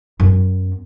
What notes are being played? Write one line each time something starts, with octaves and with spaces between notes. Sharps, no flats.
F#2 B3